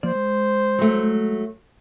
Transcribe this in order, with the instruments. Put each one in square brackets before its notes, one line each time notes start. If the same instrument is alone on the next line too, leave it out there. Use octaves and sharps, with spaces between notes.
[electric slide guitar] F3 A#3 D5 [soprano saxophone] C5
[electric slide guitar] G#3
[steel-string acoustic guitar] F#3 A3